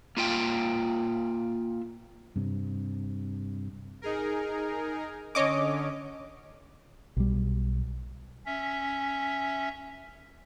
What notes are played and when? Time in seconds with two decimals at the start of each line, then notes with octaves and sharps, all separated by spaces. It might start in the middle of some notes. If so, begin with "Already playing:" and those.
0.17 A#3 F4 E5 G5
2.36 G2 C3
4.02 D#4 G#4 A#4
5.35 D3 C#4 C#5 D#5 D6
7.17 B1 G3
8.46 C#4 E5